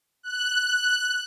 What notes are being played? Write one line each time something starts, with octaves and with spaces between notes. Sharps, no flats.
F#6